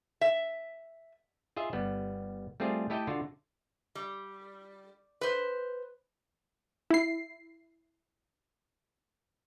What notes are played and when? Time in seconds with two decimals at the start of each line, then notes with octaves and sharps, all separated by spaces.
0.21 E5
1.56 F4 G#4 D#5 E5
1.73 G1 G3 B3
2.60 G3 A3 C4 F4 G#4
2.90 A3 E4 G4 A4 D#5 G5
3.07 D3 F4 F#4
3.95 G3
5.21 B4 C5
6.91 E4 C7